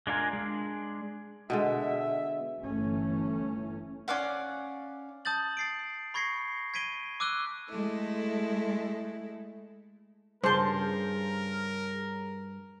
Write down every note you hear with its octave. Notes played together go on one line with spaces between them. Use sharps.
G#3 D4 F4 A#4 G#5
G#3 D4
B2 D3 G#3 E5
G1 E3 A3 C#4
C#4 D5 F5 F#5
A5 D#6 G6 A6 F#7
A6 C7 D7
B5 C#6 G#6 A#6 C7 C#7
G#6 B6 D7 D#7 G7
D6 E6 F#6 D#7 G7
G#3 A3 E4 A4
G2 C#3 A#4 C5 A5